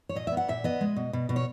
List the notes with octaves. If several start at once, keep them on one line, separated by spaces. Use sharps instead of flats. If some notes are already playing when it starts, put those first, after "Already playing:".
C#5
A#2 D#5
E5
B3
F#5
A#2 E5
B3 D#5
G#3
B2
B2
B2
C#5